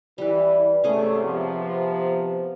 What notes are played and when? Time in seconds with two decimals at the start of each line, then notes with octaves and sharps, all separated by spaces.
0.18 E3 G3 B4
0.84 G#2 C3 A3 C#4 G#4
1.23 C3 F3 B3